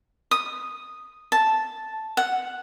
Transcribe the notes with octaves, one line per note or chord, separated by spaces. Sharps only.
D#6
A5
F#5